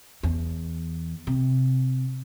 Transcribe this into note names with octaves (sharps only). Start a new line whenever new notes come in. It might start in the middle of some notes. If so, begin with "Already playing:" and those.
E2
C3